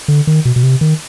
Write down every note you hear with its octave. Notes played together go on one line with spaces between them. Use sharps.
D3
D#3
B2
B2
C3
D#3